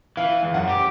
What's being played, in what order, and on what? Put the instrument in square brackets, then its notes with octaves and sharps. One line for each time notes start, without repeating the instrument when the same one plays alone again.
[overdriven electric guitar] E3 [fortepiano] F5
[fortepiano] E2
[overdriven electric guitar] F#2 [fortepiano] F#5
[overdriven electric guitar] G4